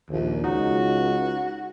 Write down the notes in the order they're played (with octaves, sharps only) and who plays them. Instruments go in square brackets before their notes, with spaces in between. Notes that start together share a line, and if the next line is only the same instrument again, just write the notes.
[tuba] A#1 [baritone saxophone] D#2
[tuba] C#2 [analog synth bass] D#4 [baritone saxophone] F#4